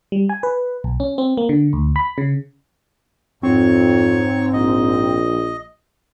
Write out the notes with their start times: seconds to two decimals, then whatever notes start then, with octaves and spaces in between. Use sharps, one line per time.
0.12 G3
0.29 G#5
0.43 B4
0.84 B1
1.00 C#4
1.18 C4
1.37 A#3
1.49 D3
1.73 D2
1.96 B5
2.18 C#3
3.43 F2 G#2 C4 C#5 C#6
4.53 A#1 D#5